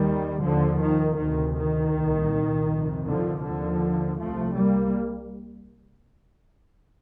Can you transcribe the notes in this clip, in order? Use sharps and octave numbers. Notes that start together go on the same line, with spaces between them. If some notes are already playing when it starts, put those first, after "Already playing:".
Already playing: D#2 D#3 G3
D#2 D3 F3
D#3
D2 C3 D#3
D#3
C2 A#2
F2 C3
D3 F3
D#2 D3 F3
C2 C3 F3 A3
G3 A#3